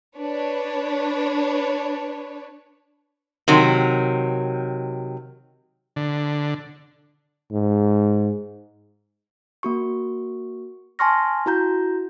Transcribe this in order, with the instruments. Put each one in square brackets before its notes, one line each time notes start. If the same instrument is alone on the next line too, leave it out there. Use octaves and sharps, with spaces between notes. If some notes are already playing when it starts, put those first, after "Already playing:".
[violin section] D4 B4 C#5
[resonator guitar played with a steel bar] C3 D#3 F#3
[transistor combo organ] D3
[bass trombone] G#2
[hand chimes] A#3 F#4 C#6
G#5 A5 C6 C#6 F6 A#6
E4 F#4 A#5 G6